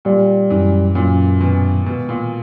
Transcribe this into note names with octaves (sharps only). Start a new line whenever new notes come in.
A#2 G3
F#2 E3
F#2 A#2
B2 D#3
B2 G#3
A#2